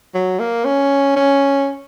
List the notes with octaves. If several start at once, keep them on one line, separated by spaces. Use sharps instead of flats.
F#3
A#3
C#4
C#4